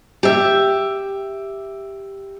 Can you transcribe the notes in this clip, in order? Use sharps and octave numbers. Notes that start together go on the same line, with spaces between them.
G4 E5